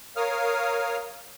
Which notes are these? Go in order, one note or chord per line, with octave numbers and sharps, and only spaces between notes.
A#4 C#5 F5 D#6 F6